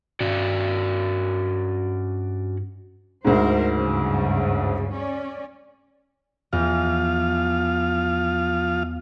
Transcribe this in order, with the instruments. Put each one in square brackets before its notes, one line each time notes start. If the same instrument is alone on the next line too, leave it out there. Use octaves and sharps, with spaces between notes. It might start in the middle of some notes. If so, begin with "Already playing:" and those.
[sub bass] G2 [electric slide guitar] C#4 F#4 D5
[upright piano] D2 G#2 [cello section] A#4 C5
[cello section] G2 C#3
C#4 D5
[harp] E2 [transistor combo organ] F3 F4 F5